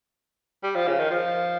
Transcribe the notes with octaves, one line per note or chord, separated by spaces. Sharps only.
G3
F3
C#3
D#3
F3